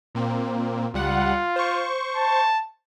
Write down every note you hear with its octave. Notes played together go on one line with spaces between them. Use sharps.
A#2 A#3 C4
C#2 G3 F4 F#5
C5 C#6
A5